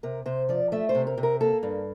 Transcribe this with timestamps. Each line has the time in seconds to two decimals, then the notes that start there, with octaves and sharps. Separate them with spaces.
0.03 C3 A#4
0.26 C3 C5
0.49 F3 D5
0.72 A3 E5
0.89 C5
0.95 C3
1.07 A#4
1.18 C3
1.23 A#4
1.41 A#3 A4
1.63 G2